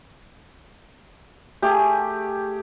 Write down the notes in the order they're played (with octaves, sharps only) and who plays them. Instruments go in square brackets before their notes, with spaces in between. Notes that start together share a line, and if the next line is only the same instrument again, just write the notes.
[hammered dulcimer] A3 G#4 [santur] G4